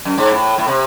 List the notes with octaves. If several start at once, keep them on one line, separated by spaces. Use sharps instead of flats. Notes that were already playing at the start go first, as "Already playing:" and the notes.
F#2
G#2
A2
A2
C3